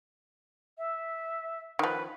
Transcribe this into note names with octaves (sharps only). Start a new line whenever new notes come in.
E5
D#3 F3 B4